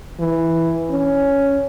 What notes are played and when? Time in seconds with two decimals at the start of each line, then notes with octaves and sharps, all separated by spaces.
0.20 E3
0.91 C#4